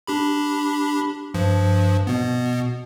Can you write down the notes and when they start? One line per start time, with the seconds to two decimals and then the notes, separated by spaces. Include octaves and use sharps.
0.07 D4 G4 B5
1.34 G2 F3
2.07 B2 B3